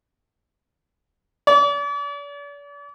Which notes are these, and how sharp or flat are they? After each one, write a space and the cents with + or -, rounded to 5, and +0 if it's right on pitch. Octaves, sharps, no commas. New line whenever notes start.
D5 -40